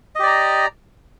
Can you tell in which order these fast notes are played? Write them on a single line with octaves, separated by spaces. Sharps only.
D#5 G4 D5 A#5